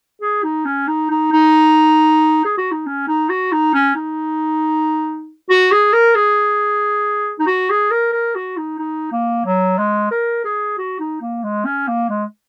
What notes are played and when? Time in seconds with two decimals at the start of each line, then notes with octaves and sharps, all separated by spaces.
0.21 G#4
0.44 D#4
0.65 C#4
0.88 D#4
1.10 D#4
1.32 D#4
2.45 G#4
2.58 F#4
2.71 D#4
2.86 C#4
3.08 D#4
3.29 F#4
3.52 D#4
3.74 C#4
3.95 D#4
5.50 F#4
5.72 G#4
5.93 A#4
6.15 G#4
7.39 D#4
7.47 F#4
7.70 G#4
7.91 A#4
8.13 A#4
8.35 F#4
8.57 D#4
8.79 D#4
9.12 A#3
9.45 F#3
9.78 G#3
10.11 A#4
10.45 G#4
10.78 F#4
10.99 D#4
11.21 A#3
11.44 G#3
11.65 C#4
11.88 A#3
12.09 G#3